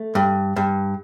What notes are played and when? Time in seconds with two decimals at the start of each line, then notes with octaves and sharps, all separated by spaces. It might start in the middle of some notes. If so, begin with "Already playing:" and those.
Already playing: A3
0.15 G2
0.56 G2